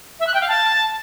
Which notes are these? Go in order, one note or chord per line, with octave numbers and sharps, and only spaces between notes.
E5
F#6
G5
F5
A5